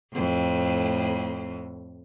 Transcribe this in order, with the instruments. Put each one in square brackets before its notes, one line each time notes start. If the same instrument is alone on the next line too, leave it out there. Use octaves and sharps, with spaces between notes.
[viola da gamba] F2 A2